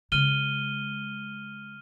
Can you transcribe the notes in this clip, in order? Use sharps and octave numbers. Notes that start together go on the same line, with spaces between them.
C#3 G#3 F6 D#7 G7